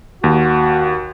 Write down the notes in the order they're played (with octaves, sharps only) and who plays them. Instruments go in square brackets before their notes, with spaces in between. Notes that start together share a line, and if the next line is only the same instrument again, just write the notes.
[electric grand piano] D#2 [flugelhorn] F#4